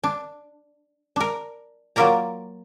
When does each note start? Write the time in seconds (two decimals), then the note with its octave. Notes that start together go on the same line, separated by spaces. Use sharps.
0.03 D4
1.16 D4 A#4
1.96 F#3 A#3 F4 A#4 D5 A#5